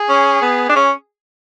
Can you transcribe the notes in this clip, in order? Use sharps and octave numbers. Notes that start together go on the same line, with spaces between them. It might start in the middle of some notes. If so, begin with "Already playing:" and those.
Already playing: G#4
C#4
B3
D4
C#4